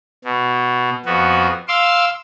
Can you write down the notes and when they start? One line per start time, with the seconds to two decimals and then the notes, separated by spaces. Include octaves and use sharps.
0.24 B2
1.06 F2 B3 F#4
1.68 F5 C6 D6 E6